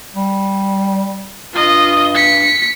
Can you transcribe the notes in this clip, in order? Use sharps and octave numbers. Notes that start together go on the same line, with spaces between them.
G3
G2 F4 D#5
B6 C#7